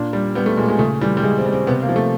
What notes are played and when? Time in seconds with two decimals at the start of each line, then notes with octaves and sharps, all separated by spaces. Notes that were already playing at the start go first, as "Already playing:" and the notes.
Already playing: A#2 D4
0.13 G3
0.35 G3 B3
0.46 A3
0.57 A#2 G#3
0.68 G#3
0.79 C#3 A3
1.01 E3 G3
1.17 G3
1.23 C#3 G#3
1.38 C4
1.46 G3
1.53 C4
1.67 C3 B3
1.82 A#3
1.89 F3
1.96 A3